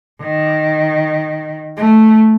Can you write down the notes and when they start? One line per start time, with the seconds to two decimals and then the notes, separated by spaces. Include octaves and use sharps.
0.21 D#3
1.77 A3